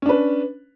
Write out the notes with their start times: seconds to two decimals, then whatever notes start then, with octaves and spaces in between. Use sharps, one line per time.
0.02 C#4
0.06 D4
0.09 B4